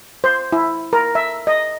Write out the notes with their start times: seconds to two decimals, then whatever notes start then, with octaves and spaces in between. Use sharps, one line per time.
0.24 C5
0.52 E4
0.93 A#4
1.15 E5
1.47 D#5